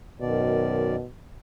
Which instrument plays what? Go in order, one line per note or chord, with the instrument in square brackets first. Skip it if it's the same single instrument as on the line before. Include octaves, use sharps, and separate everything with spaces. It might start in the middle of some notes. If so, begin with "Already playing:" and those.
[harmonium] F#2 D#3 D5 [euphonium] B2